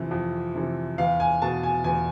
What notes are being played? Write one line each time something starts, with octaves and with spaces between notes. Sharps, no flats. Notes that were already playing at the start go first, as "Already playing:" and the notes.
Already playing: F2 C3 E3
F2
C3 E3
E2 F5
G#5
B2 A5
G#5
E2 G#5